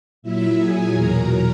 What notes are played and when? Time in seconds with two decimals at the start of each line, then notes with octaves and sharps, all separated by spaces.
0.22 A#2 F#3 E4 E5
0.57 A#2 F#3 G#4 G#5
0.93 E2 B2 F#3 A#4 A#5